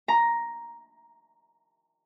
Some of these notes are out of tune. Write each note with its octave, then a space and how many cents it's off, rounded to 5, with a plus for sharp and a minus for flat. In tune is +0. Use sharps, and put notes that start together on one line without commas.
A#5 +5